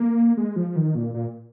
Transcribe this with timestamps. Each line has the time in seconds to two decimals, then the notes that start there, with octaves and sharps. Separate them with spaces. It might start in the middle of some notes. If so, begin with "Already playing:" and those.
Already playing: A#3
0.37 G#3
0.56 F3
0.76 D#3
0.95 A#2
1.14 A#2